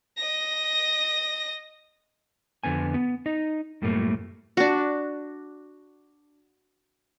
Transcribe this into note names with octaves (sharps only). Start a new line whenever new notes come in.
D#5 A#6
F2 D3 B3 G#5
B3
D#4 D#5
F#2 A2 G3 A3 A#3
D4 F#4